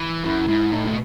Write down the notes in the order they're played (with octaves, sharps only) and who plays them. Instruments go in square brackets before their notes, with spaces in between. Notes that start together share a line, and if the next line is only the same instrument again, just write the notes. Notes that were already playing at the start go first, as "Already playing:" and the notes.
Already playing: [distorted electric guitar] E3
[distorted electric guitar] F#2 [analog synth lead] E4
[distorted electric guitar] G#2 [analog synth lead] E4
[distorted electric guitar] A2 [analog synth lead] D#4
[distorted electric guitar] B2 [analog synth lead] A3